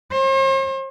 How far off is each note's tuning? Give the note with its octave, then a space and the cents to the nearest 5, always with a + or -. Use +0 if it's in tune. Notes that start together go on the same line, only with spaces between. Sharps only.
C5 +45